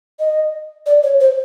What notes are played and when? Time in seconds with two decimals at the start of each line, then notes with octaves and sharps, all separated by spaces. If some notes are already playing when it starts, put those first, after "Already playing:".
0.19 D#5
0.86 D5
1.03 C#5
1.20 C5